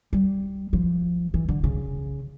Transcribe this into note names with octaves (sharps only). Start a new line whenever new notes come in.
G3
F3
E3
D3
C#3